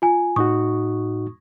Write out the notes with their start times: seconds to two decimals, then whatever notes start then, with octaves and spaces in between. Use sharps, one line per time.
0.02 F4 G#5
0.36 A2 D#4 F#4 C#6 D#6